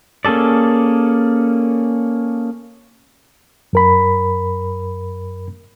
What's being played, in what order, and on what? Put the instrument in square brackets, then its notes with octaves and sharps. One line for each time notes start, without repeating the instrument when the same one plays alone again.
[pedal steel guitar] A#3 C#4 G#4 A4 D5
[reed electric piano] F#2 A#4 B5